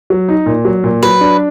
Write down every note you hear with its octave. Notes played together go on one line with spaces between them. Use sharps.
F#3
D#4
A#2
F#3
A#2
F#3 B4
D4